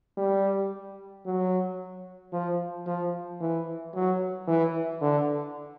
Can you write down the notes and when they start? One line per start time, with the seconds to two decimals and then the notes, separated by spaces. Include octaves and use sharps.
0.17 G3
1.26 F#3
2.33 F3
2.86 F3
3.41 E3
3.95 F#3
4.48 E3
5.01 D3